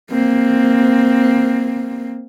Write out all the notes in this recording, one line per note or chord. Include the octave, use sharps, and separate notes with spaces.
A#3 C4